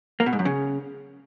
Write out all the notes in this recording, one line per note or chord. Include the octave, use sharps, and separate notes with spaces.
A#3
B2
G#2
F#2
C#3